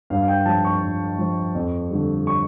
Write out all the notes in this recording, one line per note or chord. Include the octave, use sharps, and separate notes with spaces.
G2 F5
F5
G5
F3 A5
C#6
G2
F3
F2
D3 G3
C#6